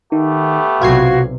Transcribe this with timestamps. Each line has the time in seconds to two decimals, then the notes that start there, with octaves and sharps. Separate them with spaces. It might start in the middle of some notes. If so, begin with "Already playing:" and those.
0.12 D#3 A3 B3 G4
0.82 B1 C3 F4 F#4 G#6 C7